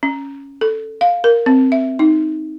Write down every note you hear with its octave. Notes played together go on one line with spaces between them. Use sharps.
C#4
A4
F5
A#4
C4
E5
D#4